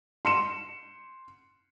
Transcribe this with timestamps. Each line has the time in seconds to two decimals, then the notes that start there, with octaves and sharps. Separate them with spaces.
0.25 C6 C#7 E7